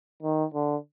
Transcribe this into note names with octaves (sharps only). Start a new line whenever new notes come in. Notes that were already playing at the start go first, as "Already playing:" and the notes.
D#3
D3